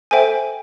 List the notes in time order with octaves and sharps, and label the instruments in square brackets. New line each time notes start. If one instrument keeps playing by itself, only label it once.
[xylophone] A4 C5 E5 G5 G#5